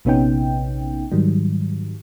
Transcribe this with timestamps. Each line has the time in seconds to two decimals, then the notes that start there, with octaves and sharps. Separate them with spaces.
0.05 A#1 C3 B3 C#4 D#4 G5
1.12 G#2 D#3 F#3 G3